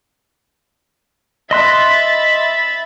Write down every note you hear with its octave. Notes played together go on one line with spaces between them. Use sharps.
D#5 E5 B5 C6 F#6 A6